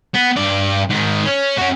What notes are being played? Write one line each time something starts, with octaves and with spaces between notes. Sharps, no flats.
B3
G2 D5
G#2 D#3
C#4
C#4 F#4